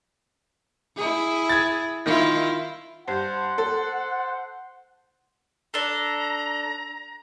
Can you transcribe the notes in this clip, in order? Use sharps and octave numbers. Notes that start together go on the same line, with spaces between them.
E4 G#4
G#6 A6
D#3 E4 F4
G2 C5 F#5
A4
D4 A4 A#5